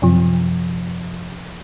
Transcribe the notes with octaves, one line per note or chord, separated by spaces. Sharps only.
F#2 C3 F3